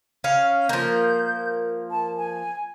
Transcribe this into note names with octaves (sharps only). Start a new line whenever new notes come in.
C#4 F5
F3 A#3 G6
A5
G#5